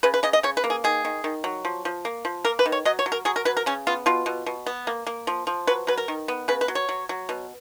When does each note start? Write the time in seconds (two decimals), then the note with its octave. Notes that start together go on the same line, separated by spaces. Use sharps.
0.03 C#3 B4
0.14 B4
0.23 C#3 D#5
0.33 D#5
0.43 C#3 C#5
0.57 B4
0.64 A#3
0.70 G#4
0.84 D#3 G#4
1.05 D#3
1.24 D#3
1.44 F#3
1.65 F3
1.85 F3
2.05 A#3
2.25 F3
2.45 A#3 A#4
2.59 B4
2.66 D#3
2.72 C#5
2.85 F#3 D#5
2.99 C#5
3.06 F#3
3.12 A#4
3.25 F#3 G#4
3.36 A#4
3.45 F#3 B4
3.57 A#4
3.66 C#3 C#4
3.87 B3 F4
4.06 B2 F4
4.26 B2
4.46 B2
4.66 B3
4.87 A#3
5.07 A#3
5.27 F3
5.47 F3
5.67 F#3 B4
5.87 F#3 B4
5.98 A#4
6.08 D#3
6.28 B3
6.48 C#3 B4
6.61 B4
6.68 F#3
6.75 C#5
6.89 F#3
7.09 F#3
7.29 B2